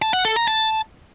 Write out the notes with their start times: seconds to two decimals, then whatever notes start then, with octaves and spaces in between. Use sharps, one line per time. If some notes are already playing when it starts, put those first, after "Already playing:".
0.02 A5
0.13 F#5
0.25 A4
0.36 A#5
0.48 A5